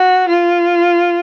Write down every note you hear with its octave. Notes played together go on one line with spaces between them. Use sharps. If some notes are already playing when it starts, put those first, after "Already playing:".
Already playing: F#4
F4